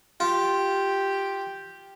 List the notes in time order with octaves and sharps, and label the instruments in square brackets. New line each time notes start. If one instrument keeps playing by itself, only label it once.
[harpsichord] F4 [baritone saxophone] G4